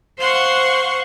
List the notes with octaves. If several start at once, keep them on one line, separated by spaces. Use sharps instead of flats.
C5 F5 F#5 C6 C#6